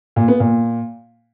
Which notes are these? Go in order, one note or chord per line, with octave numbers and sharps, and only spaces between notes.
A#2
B3
A#2